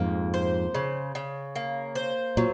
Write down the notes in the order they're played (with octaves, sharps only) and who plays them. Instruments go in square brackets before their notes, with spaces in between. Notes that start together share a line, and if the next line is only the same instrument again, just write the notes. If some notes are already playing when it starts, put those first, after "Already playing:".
Already playing: [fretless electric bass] F2 G#2 [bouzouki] A#3
[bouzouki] C5
C#3
C#3
A#3
C5
[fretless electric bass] A#2 [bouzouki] F#3